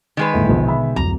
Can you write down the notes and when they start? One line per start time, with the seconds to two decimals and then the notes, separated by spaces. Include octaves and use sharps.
0.17 D#3 G#3 B4
0.33 G1 A2
0.49 A#1 B2 D3 B3
0.68 E5 B5
0.96 D1 C2 F2 A#5